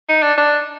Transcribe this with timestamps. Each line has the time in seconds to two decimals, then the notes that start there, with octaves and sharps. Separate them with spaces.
0.09 D#4
0.22 D4
0.38 D4